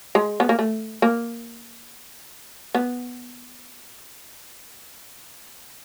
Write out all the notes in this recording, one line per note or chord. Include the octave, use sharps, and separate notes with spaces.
G#3
B3
A#3
A3
A#3
B3